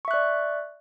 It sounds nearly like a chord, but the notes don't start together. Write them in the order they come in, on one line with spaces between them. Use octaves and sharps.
C#6 E5 F#6 D5